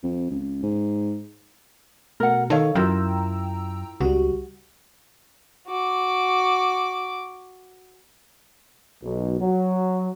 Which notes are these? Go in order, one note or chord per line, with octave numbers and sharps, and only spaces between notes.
F2
C#2
G#2
B2 A3 A#4 F#5
D#3 A4 C#5 F5
F#2 E4 F4 A#4 G5 A#5 E6
C#2 G3 F#4
F#4 D6
B1
F#3